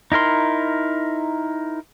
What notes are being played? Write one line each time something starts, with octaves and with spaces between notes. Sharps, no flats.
D#4 E4 A#4 C6